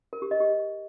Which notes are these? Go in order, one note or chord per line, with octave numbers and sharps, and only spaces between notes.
A#4
G4
D#5
G4